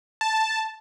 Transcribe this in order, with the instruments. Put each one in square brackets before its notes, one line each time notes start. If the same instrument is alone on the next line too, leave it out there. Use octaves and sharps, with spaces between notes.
[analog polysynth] A5